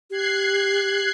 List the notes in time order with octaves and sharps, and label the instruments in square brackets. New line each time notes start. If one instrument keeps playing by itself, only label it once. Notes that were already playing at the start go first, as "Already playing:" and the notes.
[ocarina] G4 [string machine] F#6 G#6 C7